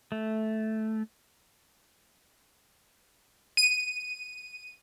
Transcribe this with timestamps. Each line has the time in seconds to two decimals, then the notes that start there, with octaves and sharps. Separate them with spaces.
0.12 A3
3.57 D#7